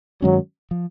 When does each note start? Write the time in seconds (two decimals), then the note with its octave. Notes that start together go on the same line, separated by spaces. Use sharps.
0.22 G2 D#3 F#3 G#3 C#4
0.71 F3